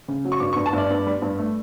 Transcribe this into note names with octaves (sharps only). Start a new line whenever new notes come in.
C#3
F#3
C#6
G2 D6
C#6
G2
A5
G2 D5
G2
G3
G2
A3